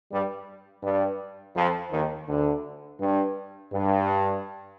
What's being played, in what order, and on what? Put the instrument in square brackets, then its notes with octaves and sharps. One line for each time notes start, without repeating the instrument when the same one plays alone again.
[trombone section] G2 G3
G2 G3
F2 F3
D#2 D#3
D2 D3
G2
G2